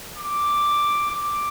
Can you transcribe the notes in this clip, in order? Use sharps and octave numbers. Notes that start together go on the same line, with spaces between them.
D6
D6